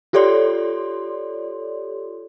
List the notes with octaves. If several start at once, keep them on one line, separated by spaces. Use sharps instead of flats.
F4 G4 A4 C#5 D5 C6